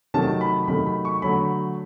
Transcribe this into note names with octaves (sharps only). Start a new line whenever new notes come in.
C3 D#3 F#3 A3 A5
B5
C3 D#3 F#3 A3 B5
B5
C#6
D3 F#3 A3 B5